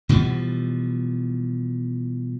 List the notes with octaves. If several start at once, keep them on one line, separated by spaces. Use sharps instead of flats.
B2 E3 F3 G3